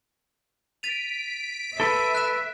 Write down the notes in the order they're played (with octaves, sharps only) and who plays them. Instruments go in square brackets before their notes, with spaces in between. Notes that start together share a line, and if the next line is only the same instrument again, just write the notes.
[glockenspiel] A6 D#7 F7 [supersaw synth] B6 D7
[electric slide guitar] A4 B4 [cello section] E5
[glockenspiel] F#6 B6 E7